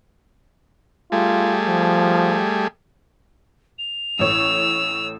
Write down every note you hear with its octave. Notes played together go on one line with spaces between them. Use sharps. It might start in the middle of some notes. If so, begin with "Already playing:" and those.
G3 A3 F4 G#4
F3
F7
A1 A2 C#5 E6